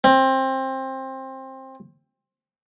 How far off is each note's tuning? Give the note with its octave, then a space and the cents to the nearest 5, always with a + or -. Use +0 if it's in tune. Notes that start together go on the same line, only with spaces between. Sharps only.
C4 +20